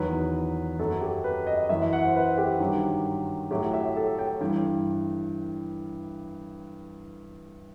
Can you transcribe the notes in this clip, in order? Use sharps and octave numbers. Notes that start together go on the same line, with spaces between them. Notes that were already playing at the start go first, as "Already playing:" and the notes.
Already playing: E2 D#3 F#3 B4
F#2 F#3 A4
G4
B4
D#5
F#2 E3 E5
F#5
C5
B4
G4
G2 D#3 F#3
A2 F#3 G4
E5
A4
G5
G2 E3 G5